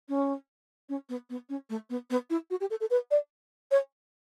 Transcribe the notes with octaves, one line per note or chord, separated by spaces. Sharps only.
C#4
C#4
B3
B3
C#4
A3
B3
B3
E4
F#4
G4
A4
A4
B4
D5
C#5